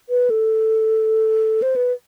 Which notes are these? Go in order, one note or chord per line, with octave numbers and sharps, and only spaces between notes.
B4
A4
C5
B4